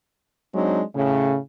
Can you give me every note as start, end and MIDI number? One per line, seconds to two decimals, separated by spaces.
0.54 0.82 54
0.54 0.82 56
0.54 0.82 60
0.54 0.82 62
0.54 0.82 63
0.95 1.37 45
0.95 1.37 49